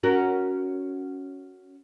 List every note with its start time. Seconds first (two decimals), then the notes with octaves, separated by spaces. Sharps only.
0.03 C#4 F#4 A#4